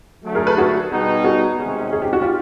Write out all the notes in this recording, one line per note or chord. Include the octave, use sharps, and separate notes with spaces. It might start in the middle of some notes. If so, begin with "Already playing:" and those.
D3 F#3 A3
G#4 A#4
A4 B4
F#4 G#4
B2 G3 B3 D#4
F#4 G#4
C3 D#3 G#3 C#4
G#4
G4
F#4
F4 G4